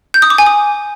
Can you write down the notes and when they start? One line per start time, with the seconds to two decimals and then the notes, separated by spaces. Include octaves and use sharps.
0.14 G6
0.22 D#6
0.30 D6
0.38 G#5
0.46 D#6